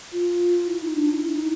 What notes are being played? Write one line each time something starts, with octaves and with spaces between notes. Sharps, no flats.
F4
E4
D#4
D4
E4
E4
D#4